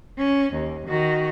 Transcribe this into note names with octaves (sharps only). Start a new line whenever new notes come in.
C#4
D#2
D#3 F#4